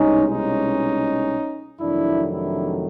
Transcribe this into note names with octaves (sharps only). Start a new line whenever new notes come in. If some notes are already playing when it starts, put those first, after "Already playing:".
Already playing: C2 B2 G#3 C#4 D#4
C#4 D#4
F2 C3 D#3 F#3 A3 D4 E4
D4 E4